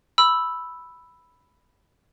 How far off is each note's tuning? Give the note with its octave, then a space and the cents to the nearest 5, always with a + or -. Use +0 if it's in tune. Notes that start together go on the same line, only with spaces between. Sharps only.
B5 +0 E6 +0